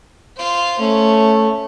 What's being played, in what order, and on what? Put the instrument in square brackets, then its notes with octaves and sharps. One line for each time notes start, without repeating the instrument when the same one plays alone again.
[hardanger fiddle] F4 C5
[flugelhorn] A3 [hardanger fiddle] C#4